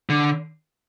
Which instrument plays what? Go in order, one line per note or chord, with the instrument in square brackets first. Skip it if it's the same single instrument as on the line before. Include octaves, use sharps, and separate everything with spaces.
[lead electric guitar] D3